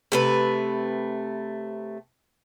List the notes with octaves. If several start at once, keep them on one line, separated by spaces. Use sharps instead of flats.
C3 A3 B4